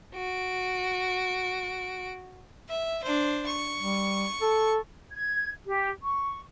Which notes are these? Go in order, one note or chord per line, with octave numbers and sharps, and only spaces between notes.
F#4 D7
E5
D4 C5
C#6
G3
A4
G#6
G4
C#6